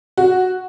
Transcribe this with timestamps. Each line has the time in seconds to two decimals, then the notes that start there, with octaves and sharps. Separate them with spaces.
0.18 F#4